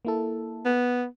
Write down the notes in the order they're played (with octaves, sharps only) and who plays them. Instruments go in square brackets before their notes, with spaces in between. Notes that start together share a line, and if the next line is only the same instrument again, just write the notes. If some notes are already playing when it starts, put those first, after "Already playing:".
[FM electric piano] A#3 E4 A4
[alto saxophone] B3